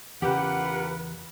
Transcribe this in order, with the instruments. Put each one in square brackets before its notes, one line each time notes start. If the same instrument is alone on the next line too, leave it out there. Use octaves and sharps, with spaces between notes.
[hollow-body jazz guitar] E2 C#3 [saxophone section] F4 A#4 F#5 [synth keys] G4 [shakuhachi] B4